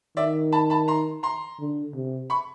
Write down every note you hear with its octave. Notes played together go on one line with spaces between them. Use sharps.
D#3 D5 E5
A5 B5
A5 B5
A#5 C6
A#5 C6
D3
C3
B5 C#6